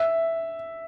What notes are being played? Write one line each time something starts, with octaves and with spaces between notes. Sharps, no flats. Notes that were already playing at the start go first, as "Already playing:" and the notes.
Already playing: E5